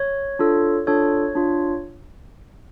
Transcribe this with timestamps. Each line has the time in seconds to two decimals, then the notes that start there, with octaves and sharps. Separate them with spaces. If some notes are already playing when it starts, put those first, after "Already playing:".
Already playing: C#5
0.39 D4 F4 A4
0.87 D4 F4 A4 C#5
1.35 D4 F4